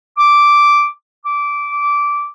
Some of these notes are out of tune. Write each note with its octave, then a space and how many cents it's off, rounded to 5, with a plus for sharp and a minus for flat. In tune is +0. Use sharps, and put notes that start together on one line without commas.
D6 -5
D6 -15